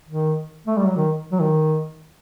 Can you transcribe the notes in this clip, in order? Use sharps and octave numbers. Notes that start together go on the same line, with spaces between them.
D#3
A3
G3
F#3
D#3
F#3
D#3